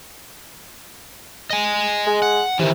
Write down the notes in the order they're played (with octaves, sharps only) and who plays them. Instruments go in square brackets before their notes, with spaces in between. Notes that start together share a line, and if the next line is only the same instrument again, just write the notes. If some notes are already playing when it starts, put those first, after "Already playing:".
[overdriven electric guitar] D#5 G#5
[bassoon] G#3
[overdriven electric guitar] F#5
[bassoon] C3 [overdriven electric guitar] D#3 E3